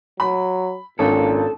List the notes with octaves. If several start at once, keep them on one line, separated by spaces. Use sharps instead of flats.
F#3 B5
G#1 A#2 C#4 D4 A4